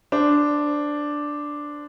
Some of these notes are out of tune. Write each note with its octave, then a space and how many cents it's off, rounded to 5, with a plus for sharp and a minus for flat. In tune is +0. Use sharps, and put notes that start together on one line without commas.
D4 +0 C5 -15